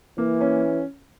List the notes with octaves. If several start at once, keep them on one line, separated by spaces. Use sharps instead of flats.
E3 A#3
C#4